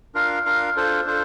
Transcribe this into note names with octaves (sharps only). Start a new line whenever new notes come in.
D4 F4 A#4 F5
D4 F4 A#4 F5
D4 F4 A4 C5
D4 F4 A4 C5